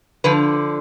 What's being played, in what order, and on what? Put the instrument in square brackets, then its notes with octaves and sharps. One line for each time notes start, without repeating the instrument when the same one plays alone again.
[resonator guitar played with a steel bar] D3 F3 B4